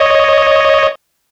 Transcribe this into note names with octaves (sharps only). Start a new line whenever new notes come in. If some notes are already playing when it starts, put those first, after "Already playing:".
Already playing: C#5 D#5